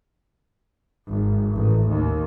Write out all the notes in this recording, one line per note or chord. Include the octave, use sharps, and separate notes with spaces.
G#1
A1
D#2